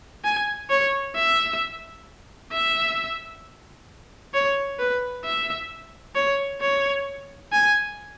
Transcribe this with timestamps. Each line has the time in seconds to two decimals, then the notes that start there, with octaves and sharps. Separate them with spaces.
0.24 G#5
0.70 C#5
1.15 E5
2.52 E5
4.34 C#5
4.79 B4
5.25 E5
6.15 C#5
6.61 C#5
7.52 G#5